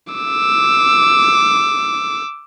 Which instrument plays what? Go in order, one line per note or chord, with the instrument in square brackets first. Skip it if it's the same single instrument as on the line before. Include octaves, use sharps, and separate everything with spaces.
[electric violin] D6 E6